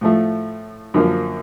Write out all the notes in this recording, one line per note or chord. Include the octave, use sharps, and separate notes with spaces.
A2 F3 A3
F#2 D3 F3 A#3